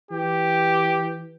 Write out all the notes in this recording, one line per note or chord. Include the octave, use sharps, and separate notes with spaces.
E3 G4